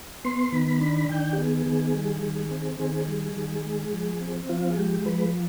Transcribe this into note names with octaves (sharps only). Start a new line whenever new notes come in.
B3 C6
D#3 B5
D4 B5
D#3 G5
G4
B3 G#4
D#3 G#4
G3
D#3
C4
D#3 G#4
G3
D#3
G#3
F3
C4
F3 F4
G#4
G#3 G4
F3 B4